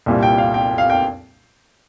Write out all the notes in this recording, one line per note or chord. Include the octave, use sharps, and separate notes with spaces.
C2 A#2 G3
G5
F5
G5
F5
G5